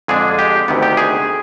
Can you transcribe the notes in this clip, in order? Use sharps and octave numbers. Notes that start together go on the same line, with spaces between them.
F2 D3 G#3 D4 G#4
G4
D2 C3 D#3 B3
G4
G#4